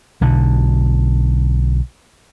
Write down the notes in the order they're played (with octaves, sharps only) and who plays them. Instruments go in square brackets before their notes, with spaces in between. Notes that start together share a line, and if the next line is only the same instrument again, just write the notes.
[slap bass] B1 D3